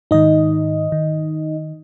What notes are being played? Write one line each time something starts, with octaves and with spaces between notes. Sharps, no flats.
G#2 D#3 D#4 D#5
D#3